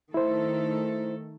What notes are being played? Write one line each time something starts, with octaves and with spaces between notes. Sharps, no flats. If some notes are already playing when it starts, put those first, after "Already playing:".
D#3 A3 E4 A4 C5